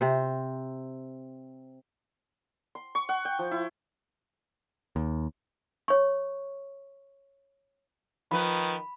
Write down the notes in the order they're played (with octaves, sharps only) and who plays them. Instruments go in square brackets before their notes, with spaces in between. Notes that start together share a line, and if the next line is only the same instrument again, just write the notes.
[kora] C3 C5
[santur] C6
C#6
F#5
G5
F3
E4
[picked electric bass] D#2
[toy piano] C#5 C#6
[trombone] D#3 [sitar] F3 B4 [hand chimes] B5